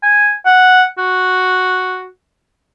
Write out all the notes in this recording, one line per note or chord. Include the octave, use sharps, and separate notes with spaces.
G#5
F#5
F#4